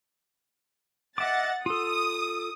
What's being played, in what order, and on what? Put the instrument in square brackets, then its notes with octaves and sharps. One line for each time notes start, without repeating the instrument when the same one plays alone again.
[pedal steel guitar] D#5 E5 D6 [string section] F#5 A6
[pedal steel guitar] F4 A4 [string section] D#6